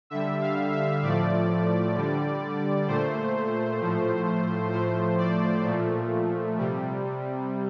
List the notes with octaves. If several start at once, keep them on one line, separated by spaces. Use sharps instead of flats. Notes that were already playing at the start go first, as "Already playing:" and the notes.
D3 G3 E5
F5
E5
A2 F3 A3 D5
D3 G3
A#2 A3 C5
A2 F3 A3
A2 F3 A3 C5
D5
A#2 F3 A3
C3 G3